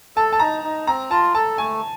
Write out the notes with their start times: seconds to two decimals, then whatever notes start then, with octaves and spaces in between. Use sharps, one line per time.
0.16 A4 A5
0.33 A5
0.40 D#4 A#5
0.64 D#4
0.87 C4 A#5
1.11 F4 A5
1.35 A4 A5
1.58 A3 G#5